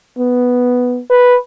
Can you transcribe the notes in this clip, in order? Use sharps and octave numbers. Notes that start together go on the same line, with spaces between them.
B3
B4